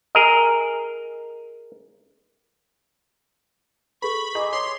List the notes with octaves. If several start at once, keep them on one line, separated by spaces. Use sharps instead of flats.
G#4 A#4 D#5
G#4 A4 B4 B5 C#6
G#4 D#5 A#5 D6
C#5 C6 D6 D#6